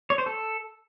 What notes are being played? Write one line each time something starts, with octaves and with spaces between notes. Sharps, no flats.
C#5
C5
A4